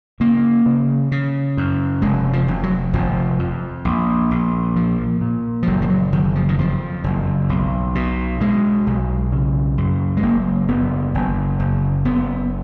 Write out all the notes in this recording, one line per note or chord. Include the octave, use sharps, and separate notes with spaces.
C#3 A#3
C#3
C#3
F#2
F1 G#3
F3
F1
F#3
F1 F3
F2
A#1
A#1
A#2 F3
A#2
F3
F#1 F#3
F3
F#3
F#1 D#3
F3
D#3
F2 F3
F#1
B1
B2
B2 G#3
B1
C#3
F#2
G#3
F#1 A#3
F#1 B3
F#1
F#1
F#1 B3